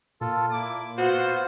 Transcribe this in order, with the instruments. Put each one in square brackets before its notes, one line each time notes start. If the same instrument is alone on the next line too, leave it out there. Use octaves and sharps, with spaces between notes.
[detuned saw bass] A#2 [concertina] F4 A4
[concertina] A#3 [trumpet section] E4 D6
[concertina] B3 F4 [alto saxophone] F#4 [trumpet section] C5